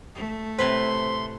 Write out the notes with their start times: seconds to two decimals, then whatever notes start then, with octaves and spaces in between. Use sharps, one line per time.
0.15 A3
0.59 A2 C3 B4 C5 C6